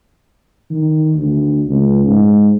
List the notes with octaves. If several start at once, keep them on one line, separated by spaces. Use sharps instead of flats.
D#3
D2
C#2
G#2